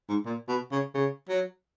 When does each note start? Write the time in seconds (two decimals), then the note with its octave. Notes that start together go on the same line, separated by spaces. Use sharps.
0.08 G#2
0.25 A#2
0.48 B2
0.72 C#3
0.94 C#3
1.29 F#3